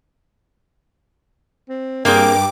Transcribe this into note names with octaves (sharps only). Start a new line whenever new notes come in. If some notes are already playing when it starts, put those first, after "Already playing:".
C4
G2 A#3 C4 G#4 A#4 G5 D6